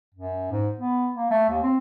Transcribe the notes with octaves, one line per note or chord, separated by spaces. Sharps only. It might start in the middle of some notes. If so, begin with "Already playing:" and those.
F#2
G#2
B3
A#3
A3
D#2
C4